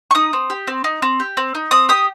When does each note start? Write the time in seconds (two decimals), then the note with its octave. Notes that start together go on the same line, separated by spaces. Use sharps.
0.11 C#6
0.15 D#4 D#6
0.33 C4
0.50 G4
0.67 C4
0.84 D#4
1.02 C4
1.20 G4
1.37 C4
1.55 D#4
1.71 C4 D#6
1.89 G4 D#6